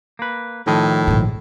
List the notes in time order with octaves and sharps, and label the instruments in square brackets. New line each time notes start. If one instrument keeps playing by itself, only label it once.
[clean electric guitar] A#3 B4
[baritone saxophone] A2 [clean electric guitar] D#3 F3 D#5
[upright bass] A#1 G#2